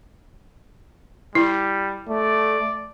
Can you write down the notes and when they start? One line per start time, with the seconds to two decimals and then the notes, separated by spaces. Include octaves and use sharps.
1.35 G3 E4
2.08 A3 D5